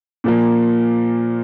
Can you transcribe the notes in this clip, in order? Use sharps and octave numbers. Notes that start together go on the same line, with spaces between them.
A#2 F3 A#3